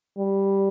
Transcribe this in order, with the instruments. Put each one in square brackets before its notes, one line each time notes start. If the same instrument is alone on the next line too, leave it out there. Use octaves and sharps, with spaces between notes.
[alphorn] G3